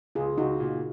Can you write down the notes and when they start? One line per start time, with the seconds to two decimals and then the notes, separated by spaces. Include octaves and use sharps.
0.15 C#2 F4 G#4
0.37 C#2 D#4 F#4
0.60 A#2